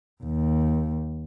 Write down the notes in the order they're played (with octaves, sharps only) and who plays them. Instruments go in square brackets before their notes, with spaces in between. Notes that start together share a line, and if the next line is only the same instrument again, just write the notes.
[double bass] D#2